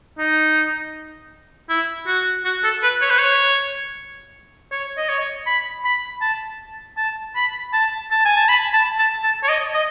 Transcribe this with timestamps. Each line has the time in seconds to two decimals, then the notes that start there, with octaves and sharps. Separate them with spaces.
0.18 D#4
1.69 E4
2.07 F#4
2.45 F#4
2.64 A4
2.83 B4
3.01 C#5
3.10 B4
3.18 C#5
4.71 C#5
4.97 D#5
5.09 C#5
5.46 B5
5.84 B5
6.22 A5
6.97 A5
7.35 B5
7.73 A5
8.11 A5
8.25 G#5
8.37 A5
8.48 B5
8.73 A5
8.98 A5
9.23 A5
9.43 C#5
9.49 D#5
9.74 D#5